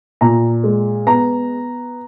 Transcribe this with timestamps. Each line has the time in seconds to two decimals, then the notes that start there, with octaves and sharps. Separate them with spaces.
0.21 A#2 A#5
0.64 G#3
1.06 B3 A#5